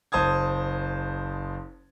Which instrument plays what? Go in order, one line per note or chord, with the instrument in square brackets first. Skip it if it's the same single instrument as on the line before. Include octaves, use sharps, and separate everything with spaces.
[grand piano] F#1 C5 A5 D#6 G#6